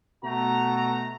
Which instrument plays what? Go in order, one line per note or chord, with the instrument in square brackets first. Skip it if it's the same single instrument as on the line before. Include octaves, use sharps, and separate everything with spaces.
[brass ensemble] B2 A3 F#4 A#5